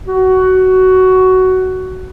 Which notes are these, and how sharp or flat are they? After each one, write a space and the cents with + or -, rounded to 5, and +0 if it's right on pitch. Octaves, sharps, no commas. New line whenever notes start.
F#4 +15